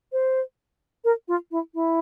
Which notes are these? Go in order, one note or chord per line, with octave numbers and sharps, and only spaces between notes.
C5
A#4
F4
E4
E4